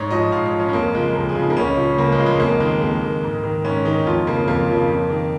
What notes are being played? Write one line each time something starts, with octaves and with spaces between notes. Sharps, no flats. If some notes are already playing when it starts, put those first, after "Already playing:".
Already playing: G#2 C#5
F3 D#5
G#2 F5
C#5
F3
C#4
G#3
F2 A#3
C#3 F3 G#3
F2 A#3
G#4
C#3 F3
D#4
A#3
C#2 C#4
C#3 F3
C#2 A#3
G#3
C#3 F3
G#3
F2 A#3
D#3 G#3
F2 A#3
D#3
G#2
D#3
G#2 C#4
D#3 D#4
F2 F4
C#3 F3 A#3
F2 A#3
C#3 F3
F2
D#3